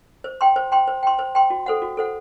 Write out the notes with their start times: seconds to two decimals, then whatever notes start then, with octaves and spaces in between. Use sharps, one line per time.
0.24 C5
0.41 G5 C6
0.56 C5
0.72 G5 C6
0.87 C5
1.03 G5 C6
1.19 C5
1.35 G5 C6
1.50 F#4
1.66 A4 C5 F#5
1.82 F#4
1.97 A4 C5 F#5